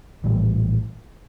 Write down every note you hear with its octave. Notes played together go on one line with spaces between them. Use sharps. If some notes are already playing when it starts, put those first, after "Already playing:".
A#1 A2 E3 G3